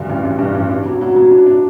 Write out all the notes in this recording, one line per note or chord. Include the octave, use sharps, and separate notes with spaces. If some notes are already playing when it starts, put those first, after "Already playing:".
Already playing: D2 G2 D3
A1
A1
G2
A1
D4
F#3
F#3
F#3
D4
D4